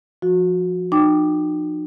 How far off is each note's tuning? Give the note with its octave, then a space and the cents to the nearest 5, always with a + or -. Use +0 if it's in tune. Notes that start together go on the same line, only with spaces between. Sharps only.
F3 +0 F#4 -25
D#4 -40 G5 +0 D6 +0